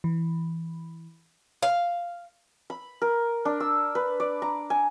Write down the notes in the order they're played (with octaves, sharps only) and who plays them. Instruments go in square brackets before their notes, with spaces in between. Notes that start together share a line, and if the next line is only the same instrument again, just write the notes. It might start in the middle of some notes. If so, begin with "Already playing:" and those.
[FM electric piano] E3
[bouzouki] F5
[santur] B5
A#4
D4
E6
B4
D5
A#5
G#5